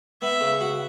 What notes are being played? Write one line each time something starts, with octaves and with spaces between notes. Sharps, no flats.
B3 E5
C#3
F#4